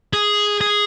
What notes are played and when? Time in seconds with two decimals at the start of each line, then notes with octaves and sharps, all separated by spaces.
0.13 G#4
0.61 G#4